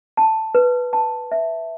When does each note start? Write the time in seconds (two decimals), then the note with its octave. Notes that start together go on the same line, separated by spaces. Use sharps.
0.17 A5
0.55 B4
0.93 A5
1.32 E5